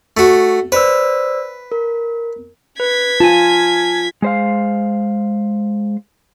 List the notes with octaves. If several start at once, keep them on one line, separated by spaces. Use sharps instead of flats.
A3 F#4
B4 C5 D5 E6
A#4
B4 G#6 B6
F4 G#5 A5
G#3 C5 F5